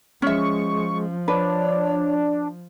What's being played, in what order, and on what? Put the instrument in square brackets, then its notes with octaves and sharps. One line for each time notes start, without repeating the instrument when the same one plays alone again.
[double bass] F3 [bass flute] G#3 [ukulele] C#4 E5 [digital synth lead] C#6
[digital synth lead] D4 [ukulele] B4 [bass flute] C#5